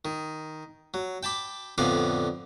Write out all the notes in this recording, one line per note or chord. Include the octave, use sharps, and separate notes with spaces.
D#3
F#3
G5 A5 B5 D6
F2 A2 D3 B3 D5 F5